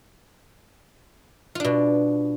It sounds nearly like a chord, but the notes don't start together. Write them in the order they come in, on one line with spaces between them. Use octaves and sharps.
F4 D4 B2